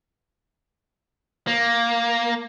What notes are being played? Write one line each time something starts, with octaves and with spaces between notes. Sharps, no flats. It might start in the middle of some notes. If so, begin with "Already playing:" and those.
A#3